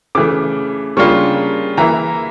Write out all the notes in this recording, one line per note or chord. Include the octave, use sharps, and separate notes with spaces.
C#3 E3 A3 D6
C#3 G3 A#3 D4 F4 C#6
E3 A#3 E4 A#5